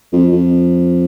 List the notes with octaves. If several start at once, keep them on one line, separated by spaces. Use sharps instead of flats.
F2
F2